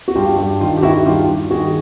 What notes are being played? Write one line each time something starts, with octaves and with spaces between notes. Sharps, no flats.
F#4
G2 F4 G4
G2
D#3 F4 G4
G4
D#3 E4 F#4
G2 F4 G4
G2
D#3 F#4 G#4